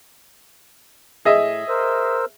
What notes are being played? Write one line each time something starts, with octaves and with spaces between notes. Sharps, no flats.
A2 G#4 D#5 E5
A#4 C5 E6